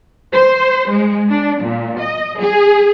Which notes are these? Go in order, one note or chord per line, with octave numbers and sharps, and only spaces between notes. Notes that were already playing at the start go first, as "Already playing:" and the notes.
C5
G#3
D4
A#2
D#5
G#4